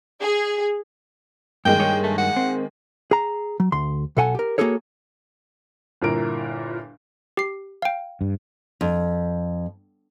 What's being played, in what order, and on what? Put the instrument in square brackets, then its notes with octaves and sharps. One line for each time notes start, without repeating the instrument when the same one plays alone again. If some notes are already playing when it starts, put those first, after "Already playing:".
[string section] G#4
[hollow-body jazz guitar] G2 [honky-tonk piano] D#3 G#3 A#3 [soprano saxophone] G5
[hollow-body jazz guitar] G2 G#4 C#5
[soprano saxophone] A3
F#5
[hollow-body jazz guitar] C4
G#4 A#5
F#3
D2 C6
B1 B2 A4 F#5 G#5
G4 A#4
A#3 B3 F#4 G#4 A4 C#5
[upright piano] G1 A#2 E4 A#4 D7
[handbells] G4 C7
F5 G5
[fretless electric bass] G2
[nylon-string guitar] F2